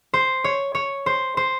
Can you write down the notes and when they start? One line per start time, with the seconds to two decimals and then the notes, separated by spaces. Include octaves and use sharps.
0.14 C5
0.44 C#5
0.75 C#5
1.06 C5
1.37 C5